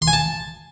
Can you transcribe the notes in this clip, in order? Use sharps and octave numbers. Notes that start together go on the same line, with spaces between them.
C6
G#5
A5